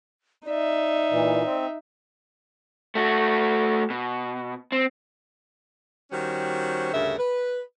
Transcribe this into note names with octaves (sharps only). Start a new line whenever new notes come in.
D#4 D5 E5
A#2 E3
C4
A3 F#4
B2
C4
D#3 G3 C#4 F#4 C5
D2 G2 C#3 A#4 E5
B4